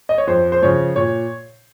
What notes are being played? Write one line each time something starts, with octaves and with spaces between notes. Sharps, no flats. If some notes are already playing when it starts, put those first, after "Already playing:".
D#5
C#5
F2 C5
C5
C#3 F3 C#5
A#2 C#5